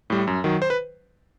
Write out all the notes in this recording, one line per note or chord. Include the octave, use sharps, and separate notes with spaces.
A2 G3
F#2
D#3 F#3
C5
B4